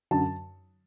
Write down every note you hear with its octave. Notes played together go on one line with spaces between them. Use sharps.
F#2 D3 F#3 A5